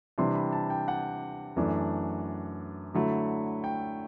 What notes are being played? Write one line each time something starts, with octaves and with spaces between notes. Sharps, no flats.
C3 E3 G3 D4 C6
B5
A5
G5
F#5
F#2 E3 A3 D4
D3 F#3 A3 E4
G5